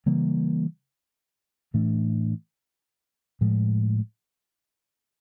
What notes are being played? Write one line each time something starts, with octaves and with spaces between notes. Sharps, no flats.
C#3 E3 G3 A#3
A2 E3 A3 D4
A2 F3 G#3